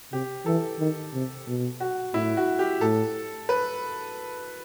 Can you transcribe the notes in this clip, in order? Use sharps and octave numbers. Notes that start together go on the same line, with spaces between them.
C3 G4
E3 A4
D#3
C3
B2
F#4
A2 E4
F#4
G4
A2 A4
B4